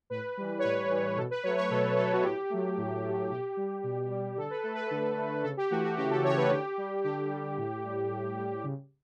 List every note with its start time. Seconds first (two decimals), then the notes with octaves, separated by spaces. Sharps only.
0.10 A2 B4
0.37 E3 G3
0.59 C#5
0.64 A2 B4
0.91 E3 G3
1.17 B2 A4
1.31 B4
1.43 F#3 A3 C#5
1.58 C#5
1.70 B2 A4
1.97 F#3 A3 A4
2.13 F#4
2.24 A2 G4
2.50 F#3 A3
2.77 A2
3.03 F#3 A3
3.30 B2 G4
3.57 G3
3.84 B2
4.10 G3
4.37 D3 A4
4.50 B4
4.63 A3 A4
4.75 B4
4.87 D3 A4
5.17 A3
5.44 C#3 A4
5.57 G4
5.70 E3 A3 F#4
5.84 F#4
5.97 C#3 G4
6.10 A4
6.24 E3 A3 C#5
6.37 B4
6.50 D3 G4
6.78 G3
7.03 D3 G4
7.31 G3
7.57 A2
7.84 G3
8.11 A2
8.37 G3
8.64 C#3